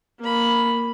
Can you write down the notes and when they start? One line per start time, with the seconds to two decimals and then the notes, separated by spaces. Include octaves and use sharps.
0.20 A#3 B5